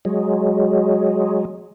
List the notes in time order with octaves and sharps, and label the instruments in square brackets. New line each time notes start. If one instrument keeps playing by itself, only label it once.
[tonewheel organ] F#3 G#3